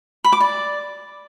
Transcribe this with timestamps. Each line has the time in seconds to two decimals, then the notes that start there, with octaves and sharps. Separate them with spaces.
0.24 B5
0.32 D6
0.40 D5